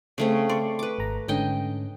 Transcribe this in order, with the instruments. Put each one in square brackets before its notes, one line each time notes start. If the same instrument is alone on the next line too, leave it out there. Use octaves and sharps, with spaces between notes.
[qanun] C#3 A3 C4
[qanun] D5 [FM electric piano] C6 C#6
[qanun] B4 D6
[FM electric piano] G#1 A#5
[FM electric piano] G#2 D3 C#4 [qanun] D#5 G5